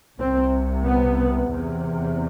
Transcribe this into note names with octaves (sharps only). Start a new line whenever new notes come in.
C2 C3 C4
B3
E2 C3